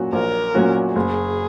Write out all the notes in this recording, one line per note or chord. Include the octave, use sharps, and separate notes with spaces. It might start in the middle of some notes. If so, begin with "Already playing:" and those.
Already playing: A#2 F#3 C#4 F#4
A#1 A#4
A#2 F#3 C#4 F#4
F#1 G#4